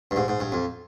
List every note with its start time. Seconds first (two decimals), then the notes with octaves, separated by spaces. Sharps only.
0.11 G2
0.16 G#2
0.28 G#2
0.40 G2
0.52 F2